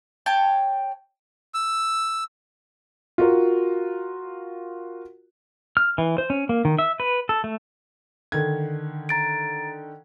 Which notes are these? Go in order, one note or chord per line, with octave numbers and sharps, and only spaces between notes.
C#5 G5 A5
E6
F4 F#4 A#4
F6
E3
C5
C#4
A#3
D#3
E5
B4
A4
A3
D3 D#3 G#6
A#5 A6 D7